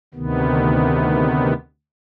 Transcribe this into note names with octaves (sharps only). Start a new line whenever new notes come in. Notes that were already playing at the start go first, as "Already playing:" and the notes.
D2 C3 D#3 B3